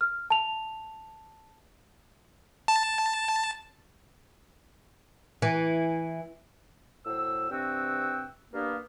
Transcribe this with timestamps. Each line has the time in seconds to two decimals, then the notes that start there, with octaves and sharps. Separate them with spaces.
0.01 F6
0.30 A5 F7
2.68 A5
5.42 E3
7.05 A2 F#3 C5 E6
7.51 G2 C3 C4 F#4 G5 E6
8.53 G2 A#3 B3